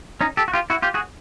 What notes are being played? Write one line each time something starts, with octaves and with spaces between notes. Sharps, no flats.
C#4 D#4
G4 A4
F#4
F4 G4
E4 F#4
F4 G4
F#4 G#4